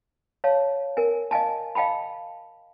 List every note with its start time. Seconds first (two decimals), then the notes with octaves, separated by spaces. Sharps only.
0.44 C#5 F5 A5
0.97 A#4 G#5
1.31 D#5 F5 G#5 A5
1.75 D#5 F5 G5 A5 B5